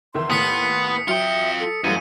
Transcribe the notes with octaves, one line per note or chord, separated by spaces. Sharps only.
E2 D#3 E5 C6
D#2 A2 B3 D#6 B6 C#7
F#3 F4 E5 G5 C#7
A4
F#2 E3 G3 A3 F5 D#7